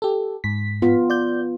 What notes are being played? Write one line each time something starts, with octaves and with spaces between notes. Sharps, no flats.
G4 A4
G#2 B6
B3 F4
D5 G6